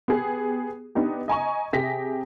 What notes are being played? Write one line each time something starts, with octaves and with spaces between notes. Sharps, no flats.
B3 G4 G#4
B3 D4 D#4 G4
D#5 G#5 A#5 C#6
C3 G4 G#4 A#6 B6